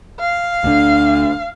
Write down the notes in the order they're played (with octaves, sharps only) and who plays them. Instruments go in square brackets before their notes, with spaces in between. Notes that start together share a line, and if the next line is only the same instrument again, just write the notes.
[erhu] F5
[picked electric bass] D2 D3